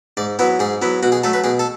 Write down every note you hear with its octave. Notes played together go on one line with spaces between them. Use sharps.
G#2 D5
F#3 B3 E4 B4
G#2 G#4
F#3 B3 E4
B2 F#4
G#4
F#3 A3 A4
B4
B2 G#4
A4